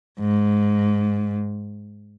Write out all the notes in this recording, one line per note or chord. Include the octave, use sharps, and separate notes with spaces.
G#2